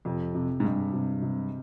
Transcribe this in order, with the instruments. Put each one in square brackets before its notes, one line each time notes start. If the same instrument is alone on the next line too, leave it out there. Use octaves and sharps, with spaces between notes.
[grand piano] F2 [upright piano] C3
[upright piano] C3
[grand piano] G#2
[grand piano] G2 [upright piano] G#3
[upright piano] C3
C3